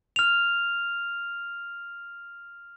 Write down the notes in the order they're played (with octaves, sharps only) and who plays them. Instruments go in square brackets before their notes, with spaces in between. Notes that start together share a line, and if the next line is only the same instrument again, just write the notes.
[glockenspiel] F6 F7